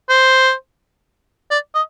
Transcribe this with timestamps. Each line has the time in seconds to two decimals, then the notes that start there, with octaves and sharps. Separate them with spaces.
0.09 C5
1.51 D5
1.75 D#5